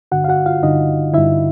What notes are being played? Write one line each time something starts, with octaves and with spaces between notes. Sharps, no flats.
G2 D3 F#4 F#5
F5
F#4 F#5
F4 F5
G2 D3 D#4 D#5
G2 D3 E4 E5